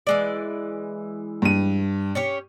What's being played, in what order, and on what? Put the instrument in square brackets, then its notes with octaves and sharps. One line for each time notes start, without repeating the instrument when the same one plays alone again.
[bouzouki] E3 G#3 D5
[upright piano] G2 D#7
[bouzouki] C#4 G4 C#5